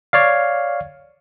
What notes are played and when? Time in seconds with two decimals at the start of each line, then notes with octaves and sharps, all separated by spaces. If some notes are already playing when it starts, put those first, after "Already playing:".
0.13 C#5 D5 F5